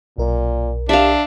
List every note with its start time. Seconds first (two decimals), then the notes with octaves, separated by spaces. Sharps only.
0.18 B1 A#2 A#4
0.89 D4 G4 E5 F5